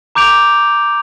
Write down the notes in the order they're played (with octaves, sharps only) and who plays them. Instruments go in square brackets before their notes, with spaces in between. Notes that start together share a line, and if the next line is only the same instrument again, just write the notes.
[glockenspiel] A#5 D6 G6 D7 F7